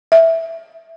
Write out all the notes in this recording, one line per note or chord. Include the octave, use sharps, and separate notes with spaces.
E5